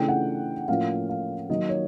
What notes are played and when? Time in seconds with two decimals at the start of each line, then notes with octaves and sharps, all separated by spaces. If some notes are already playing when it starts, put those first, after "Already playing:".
Already playing: C#3 E3 A3 D4 G5
0.08 F#5
0.68 A2 F3 A#3 C#4 F5
1.09 F5
1.49 D#3 F#3 A#3 D#5
1.69 C#5